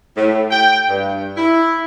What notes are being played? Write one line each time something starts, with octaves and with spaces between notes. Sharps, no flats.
A2
G5
G2
E4